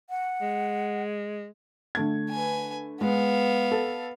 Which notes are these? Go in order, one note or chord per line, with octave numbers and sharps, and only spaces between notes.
F#5
G#3
D3 A3 G#6
B4 G#5
G#3 B3 F5
A4